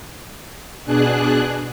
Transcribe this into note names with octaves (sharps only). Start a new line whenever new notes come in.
B2 D4 G#4 F#6